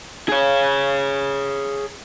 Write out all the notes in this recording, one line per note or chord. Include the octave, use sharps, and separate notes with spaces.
G#4 C#5